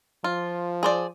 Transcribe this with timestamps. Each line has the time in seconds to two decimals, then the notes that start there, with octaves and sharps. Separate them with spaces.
0.24 F3 F4
0.83 G#4 C5 D5